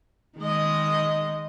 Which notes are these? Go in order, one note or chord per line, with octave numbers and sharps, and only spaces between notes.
D#3 G#3 D#5